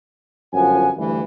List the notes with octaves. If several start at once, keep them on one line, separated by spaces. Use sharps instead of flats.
G1 F#2 F3 F#5 G#5
D2 G2 E3